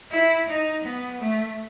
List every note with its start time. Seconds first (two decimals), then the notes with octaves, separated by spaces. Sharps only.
0.12 E4
0.48 D#4
0.84 B3
1.20 A3